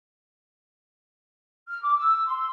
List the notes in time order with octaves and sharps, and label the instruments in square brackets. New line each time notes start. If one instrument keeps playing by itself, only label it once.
[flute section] F6
D6
E6
C6